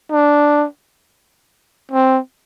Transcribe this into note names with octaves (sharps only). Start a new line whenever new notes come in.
D4
C4